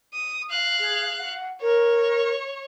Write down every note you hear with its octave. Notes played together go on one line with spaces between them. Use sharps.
D#6
F5 F#6
G#4
F#5
A#4 C#5